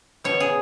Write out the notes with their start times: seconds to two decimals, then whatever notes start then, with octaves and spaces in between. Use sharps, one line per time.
0.24 B2 C#5
0.40 G#4